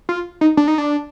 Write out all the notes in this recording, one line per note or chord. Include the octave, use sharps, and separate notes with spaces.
F4
D#4
D4
D#4
D4